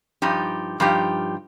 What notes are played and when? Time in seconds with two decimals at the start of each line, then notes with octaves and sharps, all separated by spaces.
0.22 G2 F3 D#4 G4
0.80 G2 F3 D#4 G4